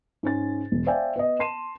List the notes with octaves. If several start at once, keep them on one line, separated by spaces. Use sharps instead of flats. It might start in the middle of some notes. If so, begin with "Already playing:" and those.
G#2 C#4 A6
E1
C5 D5 E5 F5 G5 G#5
B3 D#5
A5 C6 C7 D#7 E7